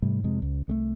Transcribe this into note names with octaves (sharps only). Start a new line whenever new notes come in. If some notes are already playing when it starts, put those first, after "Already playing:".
G#2 C3 G3 A3
F2 C3 G#3
C#2
C2 G#3 A3